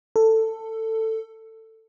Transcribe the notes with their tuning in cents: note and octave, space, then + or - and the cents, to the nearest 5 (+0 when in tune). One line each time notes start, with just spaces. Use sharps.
A4 +15